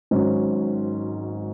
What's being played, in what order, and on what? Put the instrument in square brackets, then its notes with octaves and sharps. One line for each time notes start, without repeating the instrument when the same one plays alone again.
[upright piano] G#1 G#2 F#3 C#4